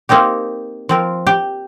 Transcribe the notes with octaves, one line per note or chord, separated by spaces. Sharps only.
A#3 C4 D#4 G4
F3 C4 A#4
G4